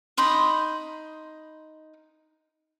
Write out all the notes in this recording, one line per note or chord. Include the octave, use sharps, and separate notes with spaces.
D#4 B5 C6 D#6